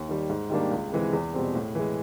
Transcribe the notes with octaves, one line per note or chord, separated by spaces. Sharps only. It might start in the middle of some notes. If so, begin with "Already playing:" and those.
Already playing: D#2
D#3 G3
G#2
D#3 G3 A#3 D4
C#2
C3 E3 G#3
E2
B2 G3 C4
A2
E3 G#3